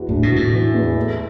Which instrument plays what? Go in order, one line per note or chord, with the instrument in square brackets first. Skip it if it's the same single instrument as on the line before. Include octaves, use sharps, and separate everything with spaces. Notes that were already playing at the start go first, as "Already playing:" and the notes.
Already playing: [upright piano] E2 E3 F#4
[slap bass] A2 [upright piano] D4
[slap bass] B2
[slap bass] A2 [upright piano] F#4
[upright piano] E3
E2
A3